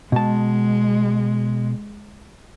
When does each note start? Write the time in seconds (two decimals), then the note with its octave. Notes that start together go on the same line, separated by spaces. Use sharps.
0.12 B2 G#3 A5